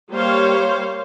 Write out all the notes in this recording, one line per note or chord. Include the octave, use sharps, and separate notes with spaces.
G3 A#3 C5 C#5 F5